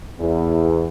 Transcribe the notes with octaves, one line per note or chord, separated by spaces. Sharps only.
E2